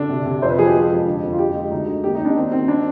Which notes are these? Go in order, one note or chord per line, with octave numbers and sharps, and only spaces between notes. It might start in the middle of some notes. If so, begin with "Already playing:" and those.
Already playing: D3 D4
C3
C3
F2 C5
B4
F3 G#4
G4
G#3
F2
D3
F2
F4
G#3 G4
G#3
D2 D#4
D3
D#2 G4
D#4
D#2
D4
D#3 C4
D#3 C4
D4